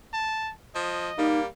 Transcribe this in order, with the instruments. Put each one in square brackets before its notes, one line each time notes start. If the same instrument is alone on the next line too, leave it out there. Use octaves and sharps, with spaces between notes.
[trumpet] A5
[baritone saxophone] F3 [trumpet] D#5
[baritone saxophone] G3 [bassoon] A#3 [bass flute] D#4